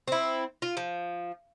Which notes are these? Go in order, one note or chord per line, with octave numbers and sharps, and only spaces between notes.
C4 E4
F4
F3